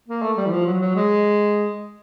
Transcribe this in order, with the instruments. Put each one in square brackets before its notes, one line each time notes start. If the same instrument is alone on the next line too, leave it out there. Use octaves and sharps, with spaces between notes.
[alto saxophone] A#3
A3
G3
E3
F3
F#3
F#3
G#3